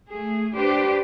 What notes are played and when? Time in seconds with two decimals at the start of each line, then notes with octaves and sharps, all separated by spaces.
0.12 A3 G#4
0.54 D4 G4 B4 C5 D5